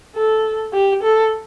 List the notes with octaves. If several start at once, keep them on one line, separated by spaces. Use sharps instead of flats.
A4
G4
A4